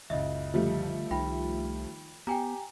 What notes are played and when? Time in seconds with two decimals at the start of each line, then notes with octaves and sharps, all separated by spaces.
0.10 F#1 C#2 D#5 E5
0.54 D3 F3 G3 A3
1.11 C2 D#3 F4 G5 B5
2.27 B3 G4 G5 G#5 A#5